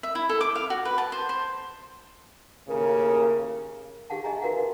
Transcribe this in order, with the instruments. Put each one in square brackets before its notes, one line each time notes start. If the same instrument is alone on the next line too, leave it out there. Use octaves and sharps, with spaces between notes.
[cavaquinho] E5
E4
A4
D6
F5
F#4
B4
A5
C5
C5
[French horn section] D#2 A2 C#3 A#3 A#4
[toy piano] G4 G#4 F5 F#5 A5
G#4 D#5 E5 G#5 A#5
F#4 A#4 B4 F5 F#5
F#4